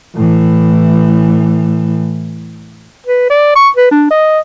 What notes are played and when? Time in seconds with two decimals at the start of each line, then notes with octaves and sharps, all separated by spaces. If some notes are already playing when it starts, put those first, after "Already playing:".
0.15 A2 E3
3.07 B4
3.30 D5
3.56 C#6
3.76 B4
3.91 D4
4.11 D#5